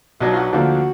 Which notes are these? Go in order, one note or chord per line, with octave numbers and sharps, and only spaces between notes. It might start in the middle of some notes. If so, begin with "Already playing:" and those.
B1 B2 F#3 D4 F#4
F4
F#4
D2 D3 F3 A#3 D4 F#4